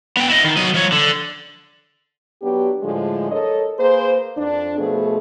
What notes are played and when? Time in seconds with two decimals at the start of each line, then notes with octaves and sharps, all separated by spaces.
0.17 B3 G5
0.30 E4 D#5
0.44 D#3
0.57 F#3 D#5
0.74 F3 C#5
0.92 D3
2.42 F#3 B3 D4 G4
2.83 A2 D3 F3 G#3
3.30 A4 A#4 C#5 D#5
3.79 A#3 G#4 B4 C5
4.37 F2 D4
4.78 B2 F3 A3 B3 G#4